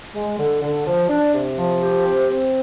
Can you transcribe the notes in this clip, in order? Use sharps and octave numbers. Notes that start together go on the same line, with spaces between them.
G#3
D3
D3
F3
D4
C3
F3
G4
C4
C4